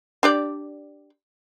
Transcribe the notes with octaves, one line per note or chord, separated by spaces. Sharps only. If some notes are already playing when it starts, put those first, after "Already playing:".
D4 G4 D5